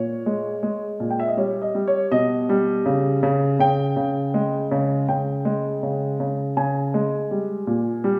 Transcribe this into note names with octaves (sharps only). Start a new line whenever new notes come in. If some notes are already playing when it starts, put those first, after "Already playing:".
Already playing: A#2 C#5
G#3
G#3
A#2
G5
E5
D#5
G3 C#5
D#5
G3
C#5
B2 D#5
G3
C#3
C#3
C#3 G5
C#3
G#3
C#3
C#3 G5
G#3
C#3
C#3
C#3 G#5
G#3
G3
A#2
G3